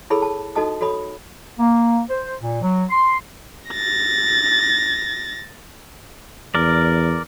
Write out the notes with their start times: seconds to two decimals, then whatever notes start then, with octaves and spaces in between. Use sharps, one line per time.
0.10 E4 G#4 A4 C#5 B5 E6
0.22 A5
0.56 D#4 F#4 A4 D#5 A5 D#6
0.81 F#4 A4 C#5 B5 D#6
1.59 A#3
2.09 C5
2.40 A#2
2.62 F#3
2.91 C6
3.70 A6 A#6
6.55 E2 A#4 D5